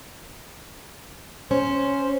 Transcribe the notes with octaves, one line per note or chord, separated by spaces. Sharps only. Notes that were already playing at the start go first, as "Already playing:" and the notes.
C#4 C5